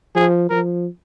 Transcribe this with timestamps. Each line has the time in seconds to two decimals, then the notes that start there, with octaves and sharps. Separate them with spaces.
0.16 F3 G#4
0.50 F3 A#4